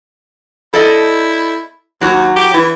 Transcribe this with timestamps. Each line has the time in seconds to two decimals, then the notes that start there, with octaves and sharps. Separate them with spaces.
0.74 E4 A4 D5 D#5
2.01 D#2 F#3 F#4
2.36 G4
2.54 E3 E4